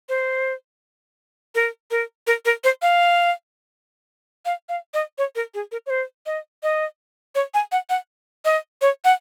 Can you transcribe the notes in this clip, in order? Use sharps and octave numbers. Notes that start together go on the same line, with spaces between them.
C5
A#4
A#4
A#4
A#4
C5
F5
F5
F5
D#5
C#5
A#4
G#4
A#4
C#5
C5
D#5
D#5
C#5
G#5
F#5
F#5
D#5
C#5
F#5